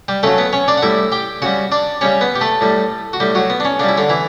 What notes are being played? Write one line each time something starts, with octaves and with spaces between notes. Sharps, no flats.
G3 G4
C#3 F#3 A3 A4
B3 B4
C#4 C#5
D4 D5
F#5
A2 G3 E4 E5
G4 G5
C#3 G3 F#4 F#5
D4 D5
C#3 G3 C#4 C#5
B3 B4
G4
A3 A4
A2 G3
F#4
A2 G3 G4
F#3 F#4
B3
D4
C#4
C#3 G3 D4
E4
D3 D4
E3 E4